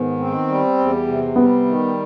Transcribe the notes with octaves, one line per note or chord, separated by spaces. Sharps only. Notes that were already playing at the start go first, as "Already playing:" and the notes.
Already playing: G#2 D#3 B3
C4
G3
E2
C3
G3 B3
D#3